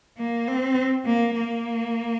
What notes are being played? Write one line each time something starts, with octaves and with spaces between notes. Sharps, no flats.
A#3
C4
A#3
A#3